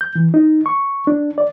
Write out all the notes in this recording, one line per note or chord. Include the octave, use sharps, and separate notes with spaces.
G6
E3
D#4
C#6
D4
D5